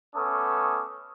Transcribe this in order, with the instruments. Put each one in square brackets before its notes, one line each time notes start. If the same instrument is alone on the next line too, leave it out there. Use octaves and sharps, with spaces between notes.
[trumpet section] A3 B3 C#4 A4 D6 D#6